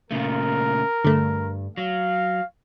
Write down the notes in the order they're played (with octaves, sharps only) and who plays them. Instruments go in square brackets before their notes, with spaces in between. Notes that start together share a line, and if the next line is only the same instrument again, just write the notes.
[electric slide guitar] A#2 C#3 A3 [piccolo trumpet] A#4
[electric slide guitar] G2 [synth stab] D3 A3
[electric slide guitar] F#3 [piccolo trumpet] F5